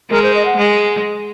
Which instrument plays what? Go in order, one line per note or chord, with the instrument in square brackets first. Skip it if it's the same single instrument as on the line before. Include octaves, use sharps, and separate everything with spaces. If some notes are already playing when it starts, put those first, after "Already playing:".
[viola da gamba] G#3 [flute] A#4
[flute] C5
D#5
F#5
[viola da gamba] G#3